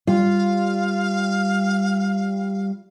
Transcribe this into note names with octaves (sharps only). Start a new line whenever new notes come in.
G3 F4 F5